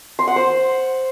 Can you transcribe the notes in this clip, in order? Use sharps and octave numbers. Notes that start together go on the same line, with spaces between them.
C6
F#5
C5